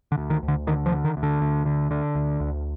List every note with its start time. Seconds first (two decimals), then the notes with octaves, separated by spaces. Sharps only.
0.12 D3
0.18 D2
0.30 D#3
0.43 D2
0.48 D3
0.67 D3 D#3
0.86 F3
0.91 D3
1.04 D#3
1.17 D2
1.23 D3
1.41 D2
1.66 D3
1.91 D3
2.15 D2
2.40 D2